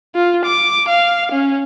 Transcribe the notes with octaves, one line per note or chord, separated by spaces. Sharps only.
F4
D6
F5
C#4